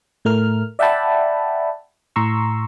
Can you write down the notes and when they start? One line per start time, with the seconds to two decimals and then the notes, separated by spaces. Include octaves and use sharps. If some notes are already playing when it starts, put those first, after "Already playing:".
0.25 A2 A3 A#4 F6
0.79 D5 E5 F#5 G5 A5 B5
2.16 A2 A#5 C6 C#6 E6